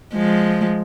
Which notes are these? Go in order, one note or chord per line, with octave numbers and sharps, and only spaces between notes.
F3 G#3